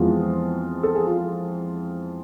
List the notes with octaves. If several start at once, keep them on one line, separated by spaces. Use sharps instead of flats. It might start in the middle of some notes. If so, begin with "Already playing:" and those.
Already playing: F2 E3 G#3 B3 F4
A4
G#4
F4